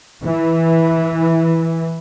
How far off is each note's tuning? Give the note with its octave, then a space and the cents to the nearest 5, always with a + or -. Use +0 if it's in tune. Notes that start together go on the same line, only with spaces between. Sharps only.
E3 -5